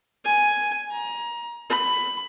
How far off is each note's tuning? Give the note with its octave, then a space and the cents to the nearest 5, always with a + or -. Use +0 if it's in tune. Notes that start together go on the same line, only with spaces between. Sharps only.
G#5 +5
A#5 +25
B5 +15